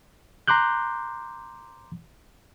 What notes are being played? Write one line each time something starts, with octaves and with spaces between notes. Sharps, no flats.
A#5 C6 D6 F#6 G6